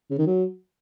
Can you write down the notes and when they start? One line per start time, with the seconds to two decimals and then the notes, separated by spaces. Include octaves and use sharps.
0.10 C#3
0.18 D#3
0.27 F#3